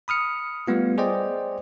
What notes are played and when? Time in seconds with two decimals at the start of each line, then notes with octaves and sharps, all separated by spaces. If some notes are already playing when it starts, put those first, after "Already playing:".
0.08 B5 D#6 F6 C#7
0.67 G3 A3 B3 F4
0.98 G#4 C5 D5 D#5 G5